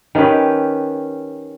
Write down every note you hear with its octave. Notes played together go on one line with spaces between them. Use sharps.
D#3 C#4 G4 B4